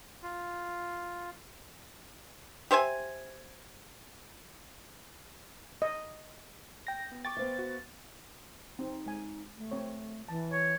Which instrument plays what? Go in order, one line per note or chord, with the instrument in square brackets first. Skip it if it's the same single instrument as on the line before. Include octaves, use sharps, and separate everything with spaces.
[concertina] F4
[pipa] G4 C5 E5 G#5
[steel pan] D#5
[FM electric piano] G5 A#6
[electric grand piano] B3
[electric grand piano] G5 C#6 D6 [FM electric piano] A6
[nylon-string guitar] B3 C5 F5
[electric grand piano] F#4
[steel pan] C4 [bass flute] D#4
[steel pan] G#3 G#5
[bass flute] A3
[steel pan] C4 C5 C#5
[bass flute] E3 [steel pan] A5
[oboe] C#5